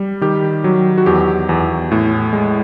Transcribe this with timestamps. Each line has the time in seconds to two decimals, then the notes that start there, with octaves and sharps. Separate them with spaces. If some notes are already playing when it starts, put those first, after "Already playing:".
Already playing: G3
0.21 D#3 G4
0.64 F#3
0.98 F#4
1.06 E2 G4
1.49 E2
1.92 A2
2.33 G#3